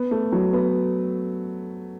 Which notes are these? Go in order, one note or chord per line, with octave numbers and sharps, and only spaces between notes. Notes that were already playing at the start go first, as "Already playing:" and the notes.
Already playing: B3
A3
F#3
B3